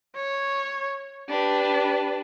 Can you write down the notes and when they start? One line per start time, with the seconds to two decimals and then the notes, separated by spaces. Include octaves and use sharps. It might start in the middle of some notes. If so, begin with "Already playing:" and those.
0.15 C#5
1.30 D4 G4 B4